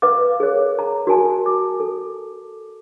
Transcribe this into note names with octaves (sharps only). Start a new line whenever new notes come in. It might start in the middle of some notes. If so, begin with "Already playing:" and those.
B4 F5 F#5 D6
G#4 A#4 C#5
A#5
F#4 A#4 G#5 A5
D6
A4